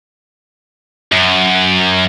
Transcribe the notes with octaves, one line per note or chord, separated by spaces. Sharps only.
F#2